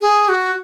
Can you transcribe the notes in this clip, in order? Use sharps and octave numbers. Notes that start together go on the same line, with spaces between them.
G#4
F#4